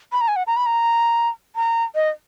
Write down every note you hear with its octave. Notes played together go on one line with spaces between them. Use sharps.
B5
A#5
G#5
F#5
A#5
B5
A#5
A#5
D#5